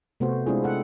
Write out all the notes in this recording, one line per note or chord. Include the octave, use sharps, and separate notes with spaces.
C3 A3 B3 C4 F#4 C5
G#3 C4 D4 E4 F4 G#4
A4 F#5